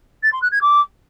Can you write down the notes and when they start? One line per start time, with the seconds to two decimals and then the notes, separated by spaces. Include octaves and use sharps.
0.23 A6
0.32 C6
0.42 F#6
0.52 G#6
0.61 D6